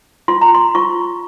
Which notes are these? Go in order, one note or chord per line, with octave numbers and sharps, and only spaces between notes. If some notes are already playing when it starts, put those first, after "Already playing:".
F4 C6
A#5
C6
F4 C#6